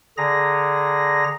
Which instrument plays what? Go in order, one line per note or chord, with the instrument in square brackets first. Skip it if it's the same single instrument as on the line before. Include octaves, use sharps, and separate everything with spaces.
[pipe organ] D3 G#4 A#5 A#6